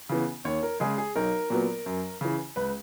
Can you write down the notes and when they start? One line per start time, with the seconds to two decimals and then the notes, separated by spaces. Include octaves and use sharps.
0.09 C#3 E3 B3
0.45 D#2 C#5
0.63 A#4
0.80 C#3 G#3 G#4
0.98 G#4
1.16 B1 A#4
1.50 A#2 F#3 B3
1.86 F#2
2.21 C#3 E3
2.56 C#2 B4